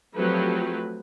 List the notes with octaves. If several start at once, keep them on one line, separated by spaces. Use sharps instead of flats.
F3 F#3 A3 C4 G4 B4